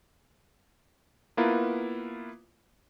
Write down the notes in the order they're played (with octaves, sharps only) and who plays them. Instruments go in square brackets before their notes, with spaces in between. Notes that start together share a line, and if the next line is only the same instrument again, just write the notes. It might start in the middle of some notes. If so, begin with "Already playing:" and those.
[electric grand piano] A#3 B3 E4 F4 A#4 B4